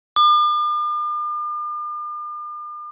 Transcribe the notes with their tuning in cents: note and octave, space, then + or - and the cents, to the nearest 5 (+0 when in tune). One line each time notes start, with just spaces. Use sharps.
D6 +45